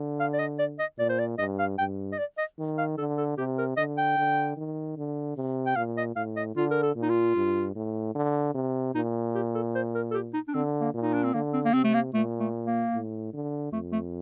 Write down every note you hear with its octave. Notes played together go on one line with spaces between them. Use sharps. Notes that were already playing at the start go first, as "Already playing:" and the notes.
Already playing: D3
F5
D5
D#5
D5
D#5
A#2 D5
C5
D5
G2 D#5
F5
G2 G5
D#5
D5
D#5
D#3
F5
D3 A4
A4
C3 G4
A#4
D3 D#5
G5
D3
D#3
D3
C3
G5
A#2 F5
D#5
A2 F5
D#5
D3 F4
A#4
A4
A#2
D#4
F4
G2
A2
D3
C3
A#2 D#4
G4
A4
C5
A#4
A4
G4
D#4
D4
D3 C4
A#3
A#2
D#4
D4
C4
D3 A#3
C4
A#3
C3 C4
A3
A#3
A#2 A3
A3
A#3
A2
D3
F2 A3
A3